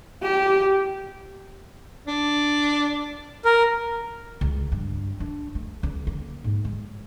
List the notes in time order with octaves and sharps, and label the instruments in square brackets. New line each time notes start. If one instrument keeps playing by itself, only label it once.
[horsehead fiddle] G4
[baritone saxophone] D4
[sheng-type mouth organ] A#4
[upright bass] C#2
G2
D4
A3
C#2
A#3
G#2
G#3